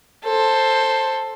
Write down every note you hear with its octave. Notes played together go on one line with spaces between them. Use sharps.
A4 C5